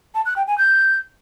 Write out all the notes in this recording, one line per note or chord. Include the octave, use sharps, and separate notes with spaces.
A5
F#6
G5
G#5
G6